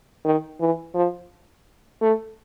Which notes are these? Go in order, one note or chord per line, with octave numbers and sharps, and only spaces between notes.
D#3
E3
F3
A3